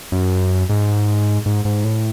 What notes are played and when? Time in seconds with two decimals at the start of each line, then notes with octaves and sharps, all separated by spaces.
0.12 F#2
0.69 G#2
1.46 G#2
1.65 G#2
1.84 A2